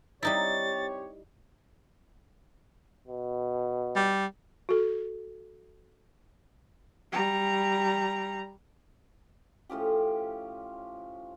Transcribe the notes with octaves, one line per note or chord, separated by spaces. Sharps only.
G3 C4 D#4 E4 G4 C#5 A6
B2
G3
F#4 A4
G3 A#5
A2 F3 C#4 G4